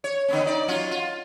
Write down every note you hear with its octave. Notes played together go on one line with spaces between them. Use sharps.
C#5
D3 B3 C#4
D#4 D5
F#3 C#4 F4
F4